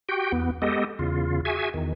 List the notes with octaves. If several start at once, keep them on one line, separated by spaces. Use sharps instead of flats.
F#4 G4 G5
E2 B3
G#3 B3 G4 A4 D#5
E2 C#3 F4
F#4 G#4 E5 G#5
E2 D#3